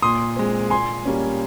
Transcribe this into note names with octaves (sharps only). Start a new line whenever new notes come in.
A#2 C6 D#6
G#3 C4
A#2 G#5 C6
G3 A#3 C#4